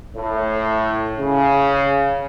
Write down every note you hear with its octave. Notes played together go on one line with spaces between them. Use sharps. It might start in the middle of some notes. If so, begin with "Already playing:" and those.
A2
C#3